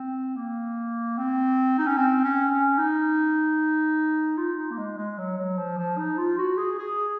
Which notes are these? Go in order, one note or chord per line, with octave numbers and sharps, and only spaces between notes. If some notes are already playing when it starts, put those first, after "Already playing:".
Already playing: C4
A#3
C4
D#4
C#4
C4
C#4
C#4
D#4
F4
D#4
A#3
G#3
G#3
F#3
F#3
F3
F3
D#4
F4
F#4
G#4
G#4